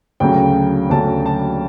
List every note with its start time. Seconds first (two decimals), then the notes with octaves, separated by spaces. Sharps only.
0.20 D2 C#3 F#3 G5
0.90 D2 C#3 F#3 A5
1.26 A5